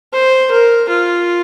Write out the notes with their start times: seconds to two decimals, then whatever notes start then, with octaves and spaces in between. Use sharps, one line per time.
0.13 C5
0.51 A#4
0.89 F4